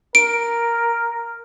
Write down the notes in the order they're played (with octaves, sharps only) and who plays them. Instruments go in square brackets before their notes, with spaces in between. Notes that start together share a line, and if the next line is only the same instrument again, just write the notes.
[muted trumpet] A#4 [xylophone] D7